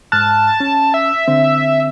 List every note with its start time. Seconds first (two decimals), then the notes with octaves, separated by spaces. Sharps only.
0.12 G#2 A5 F6 F#6
0.60 C#4
0.94 E5
1.28 D3 C4